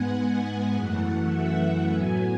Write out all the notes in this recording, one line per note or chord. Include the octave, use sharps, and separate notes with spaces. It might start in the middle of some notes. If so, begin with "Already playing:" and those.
Already playing: G#2 G#3 B3 F#5 G#5
G#5
G#5
F#2 E3 A3 F#5
F#5
E5
F#5
A2 F#3 B3 G#5